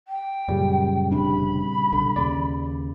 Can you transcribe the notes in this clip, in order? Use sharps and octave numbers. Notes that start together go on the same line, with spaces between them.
G5
F#2 A#2 C#3 G3
F1 C3 D4 B5
B1 D3
D#2 C#3 D5